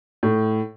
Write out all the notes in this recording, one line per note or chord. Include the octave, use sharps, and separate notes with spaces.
A2